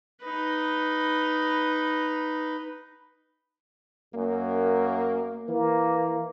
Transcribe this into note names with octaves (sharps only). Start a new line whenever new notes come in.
D#4 B4
F#2 A#3
E3 A#3